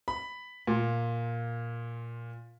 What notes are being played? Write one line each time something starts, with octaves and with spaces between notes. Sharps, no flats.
B5
A#2